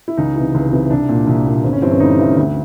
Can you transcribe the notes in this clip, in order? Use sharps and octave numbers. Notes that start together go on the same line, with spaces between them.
E4
C#2 D#4
C3 E3
C#2
C3 E3
C2 D4
A#2
C2
A#2
G1 C4
C#4
G2 E3 C4
C#4
G1 D#4
G2 E3
D2